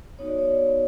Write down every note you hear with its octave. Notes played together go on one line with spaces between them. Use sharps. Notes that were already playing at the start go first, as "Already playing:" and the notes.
B3 D#4 F#4 C#5
D5
C#5